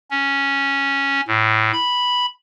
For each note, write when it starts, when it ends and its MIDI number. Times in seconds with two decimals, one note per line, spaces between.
0.11 1.21 61
1.28 1.72 45
1.73 2.26 83